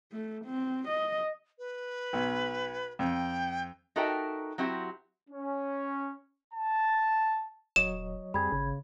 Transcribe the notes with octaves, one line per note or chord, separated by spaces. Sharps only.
A3
C4
D#5
B4
B1
F2 G5
D#4 F#4 A4 A#4 E5 G5
F#3 C4 E4 F#4 G4
C#4
A5
D#1 F#3 C#5 D#5 E7
F2 G3 C4 G#4 B5 G#6
G#1 C#3